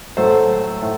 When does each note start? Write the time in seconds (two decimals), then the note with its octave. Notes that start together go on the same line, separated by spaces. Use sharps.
0.17 A2 F#3 A3 A4 C5
0.82 A2